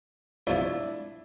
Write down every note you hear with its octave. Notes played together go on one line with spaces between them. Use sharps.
E2 C3 F3 D4 E4